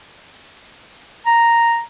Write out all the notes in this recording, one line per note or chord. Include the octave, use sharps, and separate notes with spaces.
A#5